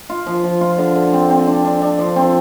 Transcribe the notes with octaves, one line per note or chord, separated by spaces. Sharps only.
F4
F3
F3
F4
D3
D3
C4
C4
D4
D4
D4
F3
C4